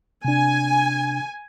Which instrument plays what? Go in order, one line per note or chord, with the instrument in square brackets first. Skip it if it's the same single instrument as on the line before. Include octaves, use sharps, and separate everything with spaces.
[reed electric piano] C3 D4 [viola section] G#5